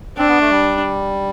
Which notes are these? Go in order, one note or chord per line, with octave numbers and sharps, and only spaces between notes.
C4 D4
B3
A3
G3